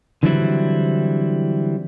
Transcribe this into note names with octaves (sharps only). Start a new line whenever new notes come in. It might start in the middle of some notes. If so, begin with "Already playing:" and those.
D3 E3 F#3 G3 C4 E4